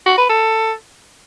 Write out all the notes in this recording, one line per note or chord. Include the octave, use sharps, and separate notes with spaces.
F#4
B4
A4